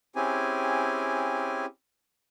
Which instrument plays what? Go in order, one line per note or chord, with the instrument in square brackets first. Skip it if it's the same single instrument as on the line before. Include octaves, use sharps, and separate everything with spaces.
[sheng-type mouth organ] C4 C#4 E4 G4 G#4 G#5